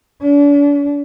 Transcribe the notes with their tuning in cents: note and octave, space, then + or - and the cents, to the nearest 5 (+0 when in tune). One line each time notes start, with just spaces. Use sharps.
D4 -40